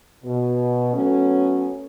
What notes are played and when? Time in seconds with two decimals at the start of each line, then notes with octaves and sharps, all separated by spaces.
0.25 B2
0.93 F#3 A3 B3 C#4